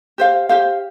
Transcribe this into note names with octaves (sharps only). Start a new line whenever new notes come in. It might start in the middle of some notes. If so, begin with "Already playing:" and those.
G4 C5 F5
G4 C5 F5